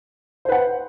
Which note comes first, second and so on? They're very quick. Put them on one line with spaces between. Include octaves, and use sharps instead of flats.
C5 B4 F#5